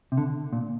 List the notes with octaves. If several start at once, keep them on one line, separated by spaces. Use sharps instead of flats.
C3
D3
A#2